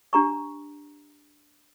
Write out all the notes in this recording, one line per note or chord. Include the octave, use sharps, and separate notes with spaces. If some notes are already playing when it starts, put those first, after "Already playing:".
D4 G4 A#5 C#6